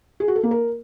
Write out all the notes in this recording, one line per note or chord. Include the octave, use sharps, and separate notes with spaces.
G#4
F#4
A4
A#3
A#4